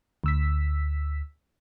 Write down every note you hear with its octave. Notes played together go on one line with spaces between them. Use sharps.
D2 E6 B6